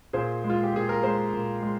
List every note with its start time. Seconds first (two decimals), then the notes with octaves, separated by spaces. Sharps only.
0.13 A#2 G#4 C5
0.44 G#3
0.50 F4
0.63 G4
0.74 A#2 G#4
0.89 A#4
1.03 G#3 G#4 C5
1.33 A#2
1.63 G#3